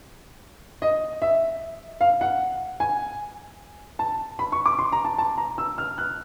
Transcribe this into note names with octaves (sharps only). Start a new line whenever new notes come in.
D#5
E5
F5
F#5
G#5
A5
B5
C#6
D6
C6
A#5
A5
A5
A#5
E6
F6
F#6